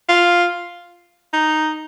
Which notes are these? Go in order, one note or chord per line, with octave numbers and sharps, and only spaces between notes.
F4
D#4